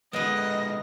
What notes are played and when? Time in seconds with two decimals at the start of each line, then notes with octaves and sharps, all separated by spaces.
0.13 D3 G#3 A#3 B3 B4 D#5